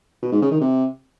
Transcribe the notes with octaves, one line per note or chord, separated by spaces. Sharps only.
B2
G#2
C#3
D#3
C3